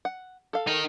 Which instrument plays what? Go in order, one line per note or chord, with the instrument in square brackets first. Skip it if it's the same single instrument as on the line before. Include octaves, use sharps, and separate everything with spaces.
[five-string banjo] F#5
A4 F5
[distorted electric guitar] D#4 A#4